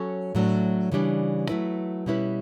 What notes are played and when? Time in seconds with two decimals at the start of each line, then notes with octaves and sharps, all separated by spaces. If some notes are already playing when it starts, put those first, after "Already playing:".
Already playing: F#3 C#4 F#4 A4 C#5
0.35 A2 F#3 A3 D4
0.92 C#3 E3 G3 D4
1.49 F#3 A3 E4 B4
2.06 B2 G3 C#4 E4 B4